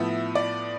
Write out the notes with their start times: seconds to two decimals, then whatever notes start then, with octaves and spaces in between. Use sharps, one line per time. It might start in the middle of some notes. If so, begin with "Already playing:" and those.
Already playing: A2 F3 B3 E5
0.35 D5